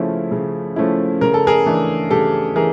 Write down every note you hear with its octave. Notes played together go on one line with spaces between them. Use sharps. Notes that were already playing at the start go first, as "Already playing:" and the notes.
Already playing: C#3 F3 A3 C#4 E4
C#3
F3 A3 C#4 E4
C#3 A#4
A4
G#4 A#4
E3 A3 D4
C#3 G4 A4
E3 G#4 A#4